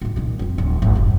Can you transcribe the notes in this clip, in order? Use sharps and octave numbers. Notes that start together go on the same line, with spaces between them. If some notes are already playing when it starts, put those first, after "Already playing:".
A2 D#3
A#2 D#3
F2 C4
D1 F3
G#1 D2
F1 G#2